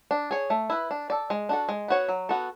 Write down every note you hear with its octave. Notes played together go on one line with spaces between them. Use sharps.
D4
G#4 C#5
A3
E4 B4
D4
A4 D5
G#3
D4 F#4 A4
G#3
B3 F#4 C#5
F#3
B3 F#4 A4